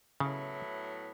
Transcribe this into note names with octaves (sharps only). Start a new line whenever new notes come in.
A2 C#3 F#3 B3 E4